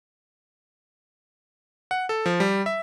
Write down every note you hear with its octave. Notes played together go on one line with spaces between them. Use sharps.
F#5
A4
F3
G3
E5